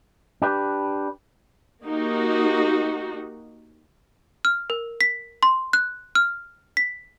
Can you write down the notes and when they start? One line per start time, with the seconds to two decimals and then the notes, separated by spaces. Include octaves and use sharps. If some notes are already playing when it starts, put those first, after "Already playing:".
0.42 D4 G4 B4
1.85 A#3 D#4 F#4 G4
4.45 F6
4.70 A#4
5.01 B6
5.43 C6
5.73 F#6
6.15 F6
6.77 B6